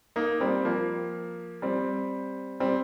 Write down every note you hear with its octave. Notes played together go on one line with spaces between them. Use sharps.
A#3 D#4
G3 C4
F3 A#3
G3 C4
G3 C4